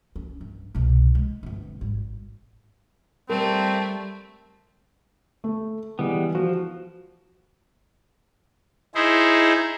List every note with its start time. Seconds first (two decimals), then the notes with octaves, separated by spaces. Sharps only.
0.16 C#4
0.41 G2
0.75 C2 B2
1.15 G#3
1.43 G1 C4
1.81 G#1 G3
3.29 G3 A3 C4 A#4
5.44 A3
5.99 E3 G3 G#3 B3
6.35 F3 F#4
8.95 D#4 E4 G#4 C5